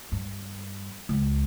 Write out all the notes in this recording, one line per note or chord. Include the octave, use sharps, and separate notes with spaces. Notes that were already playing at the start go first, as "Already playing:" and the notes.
G2
C#2